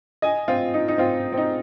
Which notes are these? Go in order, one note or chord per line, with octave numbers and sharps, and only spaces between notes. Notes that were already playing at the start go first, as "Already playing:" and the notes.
D#5 G#5
C4 F4
D#4
D#4
C4 F4
C4
D#4